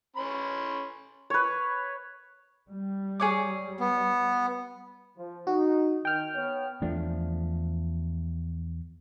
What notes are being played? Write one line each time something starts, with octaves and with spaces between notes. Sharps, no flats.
C#4 B5 C6
B4 C#5
G3
G#4 C#5 D6
B3
F3
D#4 F#4
D#3 G5 F6
B3 C#5
E2 F3 A3 D4